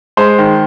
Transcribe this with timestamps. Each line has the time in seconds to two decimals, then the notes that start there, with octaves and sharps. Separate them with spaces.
0.17 G#3 C5
0.39 D#3